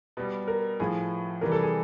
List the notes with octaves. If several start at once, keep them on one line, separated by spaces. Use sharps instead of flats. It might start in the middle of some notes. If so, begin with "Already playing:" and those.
B2 G3
A#4
A2 F3 G#4
C3 E3 G3 A#4
A4
G#4